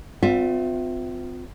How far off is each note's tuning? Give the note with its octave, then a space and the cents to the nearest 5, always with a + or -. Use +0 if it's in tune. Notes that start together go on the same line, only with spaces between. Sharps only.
C4 -40 F4 +30 E5 +0